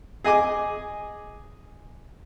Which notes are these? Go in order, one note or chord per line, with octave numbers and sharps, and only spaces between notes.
G#4 D#5 G#5 D6